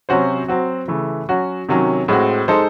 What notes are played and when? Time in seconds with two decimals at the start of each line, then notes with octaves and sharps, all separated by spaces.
0.09 C3 F#3 C#4 F#4 C5
0.48 F#3 C4 F#4
0.88 C#3 E3 A3
1.29 F#3 C#4 F#4
1.69 C3 D#3 F#3 C#4
2.08 A2 G#3 C4 F#4
2.48 G#3 D#4 A4 C5